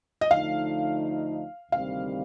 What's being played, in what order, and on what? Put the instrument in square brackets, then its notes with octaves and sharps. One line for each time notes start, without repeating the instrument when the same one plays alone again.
[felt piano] D#5
[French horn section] D2 D3 F3 A3 D#4 [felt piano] F5
[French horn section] D2 C3 D#3 G3 C4 [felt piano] F5